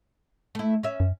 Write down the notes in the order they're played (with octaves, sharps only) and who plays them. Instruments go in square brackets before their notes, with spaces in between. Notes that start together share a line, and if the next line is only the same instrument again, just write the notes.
[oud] A3 E4
C#4 E5
[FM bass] F#2